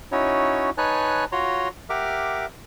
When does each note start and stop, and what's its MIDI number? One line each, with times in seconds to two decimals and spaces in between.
0.12 0.70 61
0.12 0.70 63
0.12 0.70 64
0.12 0.70 66
0.12 0.70 73
0.78 1.25 63
0.78 1.25 71
0.78 1.25 73
0.78 1.25 80
0.78 1.25 81
0.78 1.25 90
1.32 1.68 65
1.32 1.68 66
1.32 1.68 73
1.32 1.68 82
1.32 1.68 84
1.90 2.46 67
1.90 2.46 70
1.90 2.46 76
1.90 2.46 78
1.90 2.46 86
1.90 2.46 89